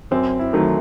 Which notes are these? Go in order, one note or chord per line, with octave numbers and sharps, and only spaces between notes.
F#2 C4
E4
D#3 F#3 A3